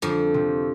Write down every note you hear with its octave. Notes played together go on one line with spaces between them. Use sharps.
F2 D3 F3
C3